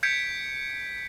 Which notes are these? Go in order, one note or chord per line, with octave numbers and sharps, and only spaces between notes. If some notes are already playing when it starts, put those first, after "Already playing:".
G6 G#6 B6 C#7 D7